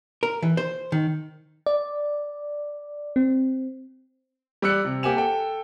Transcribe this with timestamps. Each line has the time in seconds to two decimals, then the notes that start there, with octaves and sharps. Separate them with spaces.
0.23 A#4
0.42 E3
0.57 C5
0.92 D#3
1.66 D5
3.16 C4
4.62 G3 D5 E6 F#6 C#7
4.85 C3
5.03 A#3 G4 F#5 G#5 E7
5.17 A4 G5